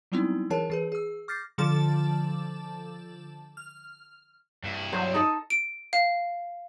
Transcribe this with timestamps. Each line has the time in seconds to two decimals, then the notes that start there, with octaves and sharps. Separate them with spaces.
0.12 F#3 G3 B3 C4 D#4 E4
0.50 E3 G#4 A#4 C#5 G#5 A5
0.70 E3 G#4 B4
0.92 G#4 E6
1.28 D6 F6 G6 A6 A#6 C7
1.58 D3 F3 A4 A5 D6 A6
3.57 F6
4.64 G2 E4
4.93 F#3 C5
5.14 D#4 A4 D#5
5.50 D7
5.93 F5